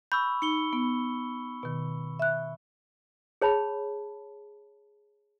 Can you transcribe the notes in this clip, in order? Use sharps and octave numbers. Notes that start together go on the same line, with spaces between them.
B5 C#6 E6 G6
D#4 C#7 G7
B3
B2 D#3
E5 F#6
G#4 C#5 A5 B5